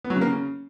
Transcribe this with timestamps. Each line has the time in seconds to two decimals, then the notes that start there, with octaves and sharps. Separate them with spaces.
0.04 B3
0.10 F#3
0.16 C#3
0.21 A#3
0.27 C#3